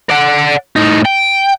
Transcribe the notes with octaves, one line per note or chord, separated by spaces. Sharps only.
D5 F#5
A2 D#4
G5